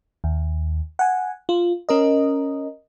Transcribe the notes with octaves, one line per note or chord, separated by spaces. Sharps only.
D#2
F#5 G#5
F4
C#4 A#4 D#5